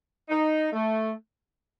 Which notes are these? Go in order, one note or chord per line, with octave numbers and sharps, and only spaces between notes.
D#4
A3